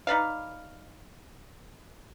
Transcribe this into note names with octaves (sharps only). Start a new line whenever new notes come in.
D#4 B4 D5 F5